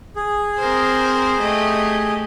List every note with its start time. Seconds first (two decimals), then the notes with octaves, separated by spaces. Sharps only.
0.16 G#4
0.59 C4 A#4 C5
1.40 A3 G4 D#5